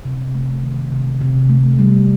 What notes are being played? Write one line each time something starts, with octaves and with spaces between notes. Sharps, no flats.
C3
A3
D#3
C3
C3
A3
G3